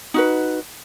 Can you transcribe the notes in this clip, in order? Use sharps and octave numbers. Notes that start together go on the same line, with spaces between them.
D#4 F#4 B4